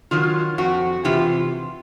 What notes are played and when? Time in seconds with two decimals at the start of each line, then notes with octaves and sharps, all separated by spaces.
0.11 D#3 F#3 F4
0.58 F2 F#4
1.05 C3 E3 F4 G4